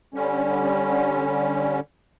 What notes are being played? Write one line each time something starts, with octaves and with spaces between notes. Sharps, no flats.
D3 G3 C#4